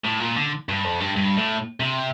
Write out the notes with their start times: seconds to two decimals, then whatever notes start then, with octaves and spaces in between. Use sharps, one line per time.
0.05 A2
0.20 A#2
0.36 D3
0.69 G2
0.84 F2
1.00 G2
1.16 G2
1.37 A2
1.80 C3